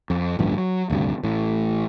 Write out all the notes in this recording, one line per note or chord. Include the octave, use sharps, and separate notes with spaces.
F2
A1 D2 G2 F3
F#3
D#1 D2 G2 C3
A1 A2